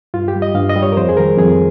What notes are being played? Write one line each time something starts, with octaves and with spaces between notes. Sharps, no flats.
G2 F4
G4
G3
D#5
G2 F5
D#5
G3
C#5
A#4
F2 C5
G#4
D#3 G3 A#4
F2 G#4